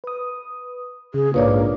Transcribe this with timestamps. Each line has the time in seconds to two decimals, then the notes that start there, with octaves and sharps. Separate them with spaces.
0.04 B4 D#6
1.14 C#3 G#4
1.34 A#1 G#2 A#3 D4 F4 B4 C#5 D5